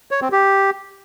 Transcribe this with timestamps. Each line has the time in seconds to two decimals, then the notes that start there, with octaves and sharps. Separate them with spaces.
0.11 C#5
0.22 C4
0.32 G4